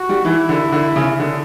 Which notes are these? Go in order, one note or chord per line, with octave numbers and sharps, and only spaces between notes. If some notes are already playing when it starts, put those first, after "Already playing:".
Already playing: F#4
G3
E3 E4
D3
D3
C#3
D3